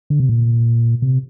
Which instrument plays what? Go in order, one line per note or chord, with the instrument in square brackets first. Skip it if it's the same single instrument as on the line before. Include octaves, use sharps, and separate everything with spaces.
[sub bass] D3
C3
A#2
C3